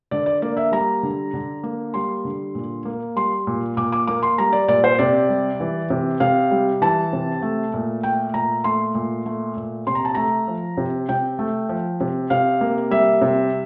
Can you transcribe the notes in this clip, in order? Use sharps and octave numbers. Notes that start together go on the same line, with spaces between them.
D3 D5
D5
A#3 D5
E5
G3 A#5
D3
D3
A#3
G3 C6
D3
A#2
A#3
G3 C6
A#2
A#2 D6
D6
A#3 D6
C6
G3 A#5
D5
A#2 D5
C5
C3 D5
G3
E3
C3
C3 F5
G3
E3 A5
C3
A3
A#2
A3 G5
A#2 A#5
A3 C6
A#2
A3
A#2
C3 C6
A#5
A5
A3 A#5
F3
C3
C3 G5
A3
F3
C3
C3 F5
A#3
G3 E5
C3